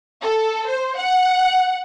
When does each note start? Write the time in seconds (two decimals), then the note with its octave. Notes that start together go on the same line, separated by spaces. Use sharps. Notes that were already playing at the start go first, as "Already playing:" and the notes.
0.21 A4
0.67 C5
0.97 F#5